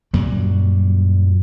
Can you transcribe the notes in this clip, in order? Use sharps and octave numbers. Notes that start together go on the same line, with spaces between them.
F#2 A#2 F#3 G3